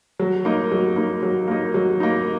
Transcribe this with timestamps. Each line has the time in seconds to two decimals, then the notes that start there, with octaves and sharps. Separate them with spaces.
0.19 F#3
0.45 A#3 D#4
0.71 F#3
0.96 A#3 D#4
1.23 F#3
1.48 A#3 D#4
1.74 F#3
2.00 A#3 D#4